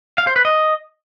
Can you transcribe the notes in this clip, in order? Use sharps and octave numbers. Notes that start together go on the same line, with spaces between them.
F5
C5
B4
D#5